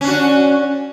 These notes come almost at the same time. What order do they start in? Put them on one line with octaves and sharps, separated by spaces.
C#4 D4 F#4